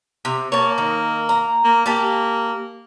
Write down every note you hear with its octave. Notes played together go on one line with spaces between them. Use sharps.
C3
A#3 C#5 A5
D#3
A#5
A#3
A#3 G4 A5